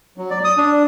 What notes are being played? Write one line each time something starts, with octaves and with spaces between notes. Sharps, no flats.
F#3
D5
D#6
D4